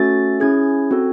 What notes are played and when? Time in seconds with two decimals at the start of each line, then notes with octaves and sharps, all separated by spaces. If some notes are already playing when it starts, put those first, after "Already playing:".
Already playing: A3 C#4 F#4 A4 A6
0.40 C#4 E4 G#4 G#6
0.91 C4 F#4 A4